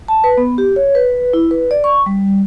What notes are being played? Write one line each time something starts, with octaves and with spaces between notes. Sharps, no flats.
A5
B4
B3
G4
C#5
B4
E4
B4
D5
C#6
G3